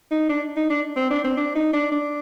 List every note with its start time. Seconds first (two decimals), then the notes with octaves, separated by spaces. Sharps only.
0.11 D#4
0.29 D4
0.56 D#4
0.70 D4
0.96 C4
1.10 D4
1.24 C4
1.37 D4
1.55 D#4
1.73 D4
1.92 D4